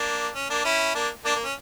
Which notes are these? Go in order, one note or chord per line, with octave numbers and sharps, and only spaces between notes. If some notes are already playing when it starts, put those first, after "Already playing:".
Already playing: A#3 D4
C#4
A#3 D4
C#4 E4
A#3 D4
A#3 D4
A#3
C#4